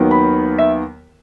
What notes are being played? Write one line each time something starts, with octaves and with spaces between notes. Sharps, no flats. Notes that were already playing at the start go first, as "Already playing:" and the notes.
Already playing: D#2 D#3 F#3 B3
B5
E5